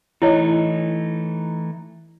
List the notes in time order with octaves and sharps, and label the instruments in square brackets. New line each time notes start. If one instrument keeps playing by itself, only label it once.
[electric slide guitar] E3 A3 D#4 [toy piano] E4 C#5 D#5